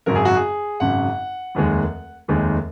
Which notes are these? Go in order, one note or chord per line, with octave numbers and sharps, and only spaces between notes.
G#1 F#2 C#3 F#3 A#4
G#4
F#4
G#4
G#1 F#2 C#3 F#3 F#5
F1 D#2 D#3 G#3
F1 D#2 D#3 G#3